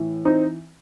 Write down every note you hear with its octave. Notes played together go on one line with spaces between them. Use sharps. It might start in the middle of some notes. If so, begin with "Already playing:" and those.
Already playing: A2 E3
C4 D#4